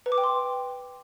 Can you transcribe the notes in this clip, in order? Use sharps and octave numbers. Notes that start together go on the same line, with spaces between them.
B4
D6
G5
C6